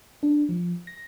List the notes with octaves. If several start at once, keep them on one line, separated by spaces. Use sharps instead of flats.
D4
F3
A#6